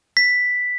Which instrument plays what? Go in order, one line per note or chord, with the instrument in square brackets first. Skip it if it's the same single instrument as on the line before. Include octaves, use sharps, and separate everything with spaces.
[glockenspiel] B6